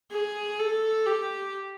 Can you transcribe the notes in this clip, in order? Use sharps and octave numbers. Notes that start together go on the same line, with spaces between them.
G#4
A4
G4